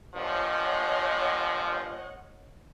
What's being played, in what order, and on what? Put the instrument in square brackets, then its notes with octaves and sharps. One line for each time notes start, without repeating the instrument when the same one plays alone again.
[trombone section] G2 A#2 F3 [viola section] C#5 D#5 F#5